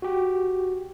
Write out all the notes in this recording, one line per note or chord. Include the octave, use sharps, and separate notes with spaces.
F#4 G4